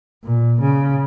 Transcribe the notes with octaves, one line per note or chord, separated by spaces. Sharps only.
A#2
C#3